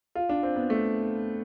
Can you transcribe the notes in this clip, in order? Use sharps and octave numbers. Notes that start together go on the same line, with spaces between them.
F4
D4
C4
B3
A3